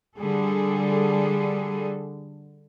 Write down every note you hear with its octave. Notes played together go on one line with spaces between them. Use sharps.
D3 G3 G#4 A4